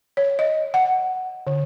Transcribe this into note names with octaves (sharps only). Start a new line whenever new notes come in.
C#5
D#5
F#5
D3